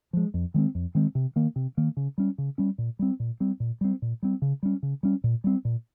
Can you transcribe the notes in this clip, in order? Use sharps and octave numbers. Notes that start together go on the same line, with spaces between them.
F3 G#3
F2
D#3 G#3 C4
F2
D#3 G#3 C4
C3
D#3 A#3
C3
D#3 A#3
C#3
G3 C#4
C#3
G3 C#4
A#2
G3 C4
A#2
G3 C4
A#2
G3 C4
A#2
G3 C4
C#3
G3 C#4
C#3
G3 C#4
A#2
G3 C4
A#2